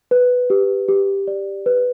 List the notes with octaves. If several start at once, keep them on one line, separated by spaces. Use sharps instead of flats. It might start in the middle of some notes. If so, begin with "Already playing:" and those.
B4
G4
G4
D5
B4